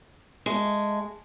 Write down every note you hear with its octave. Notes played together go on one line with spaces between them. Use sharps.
G#3 A3